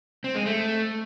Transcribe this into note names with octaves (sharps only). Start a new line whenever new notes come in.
C4
G#3
A3